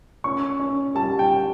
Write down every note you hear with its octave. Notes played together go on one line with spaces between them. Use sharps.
C#4 C#6
C#4
G3 A5
G5